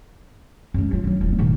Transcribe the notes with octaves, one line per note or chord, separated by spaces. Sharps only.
F#2 G#3
F#3 F4
D3 F#3
E1
A#2 D#3